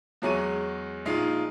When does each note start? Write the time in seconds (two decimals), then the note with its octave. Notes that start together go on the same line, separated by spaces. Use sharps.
0.22 E2 F#3 G#3 C#6 D#7
1.05 A#1 G#3 D#4 F4 F5 C7